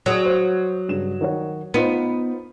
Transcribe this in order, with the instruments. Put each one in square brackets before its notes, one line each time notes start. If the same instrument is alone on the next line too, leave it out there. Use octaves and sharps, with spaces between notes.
[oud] F#3 [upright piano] G#4 D#6
[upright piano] C5
G2 C#3 E7
D#3 F#4 C#5
[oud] B3 [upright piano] D#4 F4 C5